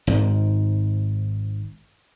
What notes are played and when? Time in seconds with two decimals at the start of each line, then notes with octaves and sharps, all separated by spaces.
0.07 G#1 G#2